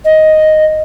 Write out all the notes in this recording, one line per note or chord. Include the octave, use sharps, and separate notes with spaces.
D#5